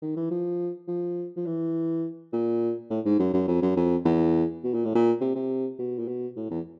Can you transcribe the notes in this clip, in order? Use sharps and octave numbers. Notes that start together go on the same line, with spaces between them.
D#3
E3
F3
F3
F3
E3
A#2
A2
G#2
F#2
F#2
F2
F#2
F2
E2
B2
A#2
A2
A#2
C3
C3
B2
A#2
B2
A2
E2